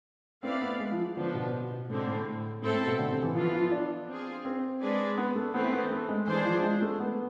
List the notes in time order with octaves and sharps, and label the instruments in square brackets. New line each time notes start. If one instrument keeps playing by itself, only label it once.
[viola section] A3 E4 B4 D5 F5 [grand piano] C4
[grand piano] B3
G#3
F3
[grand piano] D3 [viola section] F3 B3 D4
[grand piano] B2
B2
B2
[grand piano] A2 [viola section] D3 G#3 C4
[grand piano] A2
[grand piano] A2 [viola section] C4 E4 A4
[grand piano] A2
B2
D3
C3
E3
[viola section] E3 B3 F4 [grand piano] F3
[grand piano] F3
D4
[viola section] C4 F4 G#4
[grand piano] C4
[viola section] G#3 D4 G#4 B4 D5
[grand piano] B3
A3
[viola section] E3 A3 C4 [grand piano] B3
[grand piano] B3
A3
G#3
[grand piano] E3 [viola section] G#3 D4 G#4 C5
[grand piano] F3
G#3
A3
B3